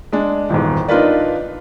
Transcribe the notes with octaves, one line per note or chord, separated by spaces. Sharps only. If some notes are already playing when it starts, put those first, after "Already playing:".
G#3 D4
D#1 E2 G#2
D4 D#4 F4 A#4 B4 D5